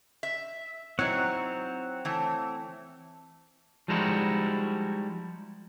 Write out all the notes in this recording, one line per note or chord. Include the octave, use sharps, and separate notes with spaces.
E5
F#3 C4 D#4 E4 C#5 F#5
E3 A3
F3 G3 G#3 D#4 E4 F#4